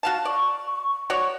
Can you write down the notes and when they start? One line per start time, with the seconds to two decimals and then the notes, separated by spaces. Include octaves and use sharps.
0.03 F#4 F5 A5
0.25 D5 C#6
1.10 F#4 C#5 D5